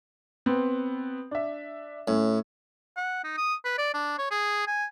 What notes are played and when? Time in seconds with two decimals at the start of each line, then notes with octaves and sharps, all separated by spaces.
0.46 B3 C4
1.31 D4 E5
2.08 A2 C#4
2.97 F#5
3.24 D#4
3.37 D#6
3.65 B4
3.78 D5
3.94 D4
4.18 C#5
4.31 G#4
4.67 G#5